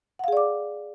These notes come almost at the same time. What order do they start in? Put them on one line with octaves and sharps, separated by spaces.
F#5 F5 G#4 D5 D6